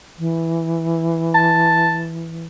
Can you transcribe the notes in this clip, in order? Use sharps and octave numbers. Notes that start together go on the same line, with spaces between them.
E3
A5